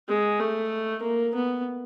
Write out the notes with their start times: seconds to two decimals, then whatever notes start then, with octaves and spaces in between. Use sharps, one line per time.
0.08 G#3
0.40 A3
1.03 A#3
1.35 B3